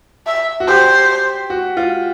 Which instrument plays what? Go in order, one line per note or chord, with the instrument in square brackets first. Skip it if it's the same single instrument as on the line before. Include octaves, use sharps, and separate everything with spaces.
[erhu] E5
[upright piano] F#4
[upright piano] G4 [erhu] C5
[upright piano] F#4
F4